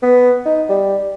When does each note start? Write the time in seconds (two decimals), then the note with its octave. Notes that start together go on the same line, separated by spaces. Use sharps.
0.02 B3
0.45 D#4
0.69 G3